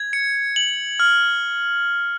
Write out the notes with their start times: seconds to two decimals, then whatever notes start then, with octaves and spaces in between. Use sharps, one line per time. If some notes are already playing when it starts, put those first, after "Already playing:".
Already playing: G#6
0.13 C#7
0.56 F#7
1.00 F6